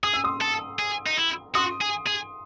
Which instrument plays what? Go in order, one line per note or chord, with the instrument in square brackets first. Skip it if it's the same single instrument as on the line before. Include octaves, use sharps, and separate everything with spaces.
[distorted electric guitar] G#4 [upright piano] D#6
[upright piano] E6
C6 D#6
[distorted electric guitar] A4
G#4
D#4
E4
[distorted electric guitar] F#4 [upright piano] C6 D#6
[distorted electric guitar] G#4
G#4